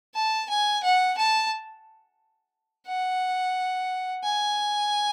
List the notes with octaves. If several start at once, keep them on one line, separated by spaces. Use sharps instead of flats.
A5
G#5
F#5
A5
F#5
G#5